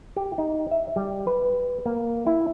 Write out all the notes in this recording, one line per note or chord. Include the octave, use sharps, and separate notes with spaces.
G4
D#4
E5
G3
B4
A#3
E4